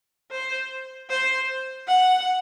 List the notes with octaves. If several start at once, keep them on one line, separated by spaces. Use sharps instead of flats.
C5
C5
F#5